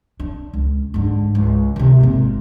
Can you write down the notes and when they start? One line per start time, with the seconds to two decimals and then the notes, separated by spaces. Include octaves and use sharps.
0.20 D4
0.53 C#2
0.94 G#2 D3
1.35 C#2
1.76 C3 D#3
2.01 G#1 A#2